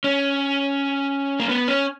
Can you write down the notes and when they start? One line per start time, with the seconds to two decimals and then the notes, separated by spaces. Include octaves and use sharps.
0.04 C#4
1.40 A#3
1.49 B3
1.68 C#4